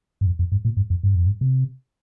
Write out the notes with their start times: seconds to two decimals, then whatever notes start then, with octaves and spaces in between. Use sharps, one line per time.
0.21 G2
0.26 F2
0.39 F2
0.52 G2
0.65 A#2
0.77 G2
0.90 F2
1.03 G2
1.15 F2
1.26 G2
1.41 C3